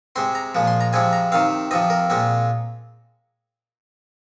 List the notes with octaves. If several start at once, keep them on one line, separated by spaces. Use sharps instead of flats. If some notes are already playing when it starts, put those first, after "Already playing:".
C3 G#3 C4 C6
A#5
A#2 F3 G#3
C6
A#5
C3 F3 G#3 C4 G#5
A#5
C3 D#3 C4 F5
C3 F3 C4 D#5
A#4
A#2 G#3 C4